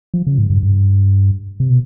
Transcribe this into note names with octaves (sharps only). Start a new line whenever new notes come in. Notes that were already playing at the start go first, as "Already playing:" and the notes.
F3
C#3
G#2
G2
G2
C3
B2